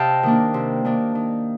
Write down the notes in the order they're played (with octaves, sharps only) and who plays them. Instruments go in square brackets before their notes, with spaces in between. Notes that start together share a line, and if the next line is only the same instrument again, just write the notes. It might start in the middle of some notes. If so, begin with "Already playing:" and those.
Already playing: [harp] C3 D#5 F5 G5 A5
D#3 A#3 D4
C3
D#3 A#3 D4
D#3